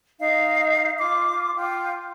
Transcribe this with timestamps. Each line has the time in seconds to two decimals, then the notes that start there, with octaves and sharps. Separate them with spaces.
0.19 D#4 D#5 F5
0.97 F4 D6
1.56 F4 G5